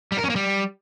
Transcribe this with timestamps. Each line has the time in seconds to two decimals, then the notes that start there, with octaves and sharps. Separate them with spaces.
0.12 G3
0.18 A#4
0.24 C#4
0.30 A#3
0.36 G3